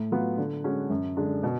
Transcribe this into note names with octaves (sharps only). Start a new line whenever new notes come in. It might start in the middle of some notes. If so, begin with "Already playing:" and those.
Already playing: A2
F#3 B3 F4
D3
G#3 C#4 F#4
F#2
D3 G#3 D4
B2